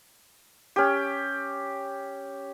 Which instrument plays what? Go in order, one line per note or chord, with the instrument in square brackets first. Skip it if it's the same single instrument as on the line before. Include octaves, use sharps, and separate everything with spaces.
[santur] C#4 G4